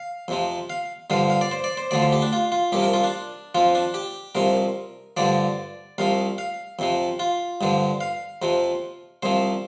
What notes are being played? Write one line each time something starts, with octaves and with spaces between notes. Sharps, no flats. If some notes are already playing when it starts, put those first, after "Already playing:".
Already playing: F5
F2 C3 F3
F5
G2 D3 F3 F5
F5
D5
C5
D5
C5
D2 D3 F3 D5
C5
G4
D4
F4
F4
C2 C3 F3 G4
A#4
F4
D4
F2 F3 F4
D4
G4
C2 C3 F3 A#4
G2 D3 F3 D5
C2 C3 F3 F5
F5
F2 C3 F3
F4
G2 D3 F3
F5
F2 C3 F3
C2 C3 F3 C5